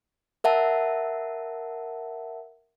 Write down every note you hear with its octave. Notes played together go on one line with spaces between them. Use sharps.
A#4 E5 F#5 A5